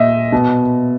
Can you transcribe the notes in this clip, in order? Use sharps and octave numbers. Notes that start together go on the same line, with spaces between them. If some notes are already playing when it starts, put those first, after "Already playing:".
Already playing: A#2 D#5 E5
B2